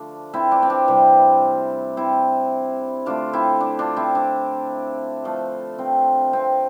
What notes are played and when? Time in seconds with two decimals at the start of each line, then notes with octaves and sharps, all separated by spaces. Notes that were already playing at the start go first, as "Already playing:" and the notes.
Already playing: D3 F3 A3 D4
0.34 C4 E4
0.52 D4
0.62 C4
0.70 D4
0.88 C3 E3 G3
1.97 C4 E4
3.06 D3 A3 D4 F4
3.33 C4 E4
3.60 D4
3.79 D4 F4
3.97 C4 E4
4.15 D4
5.24 D3 F3 A3
5.79 C4
6.33 C4